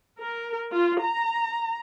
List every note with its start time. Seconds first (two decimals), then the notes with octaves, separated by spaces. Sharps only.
0.19 A#4
0.72 F4
1.02 A#5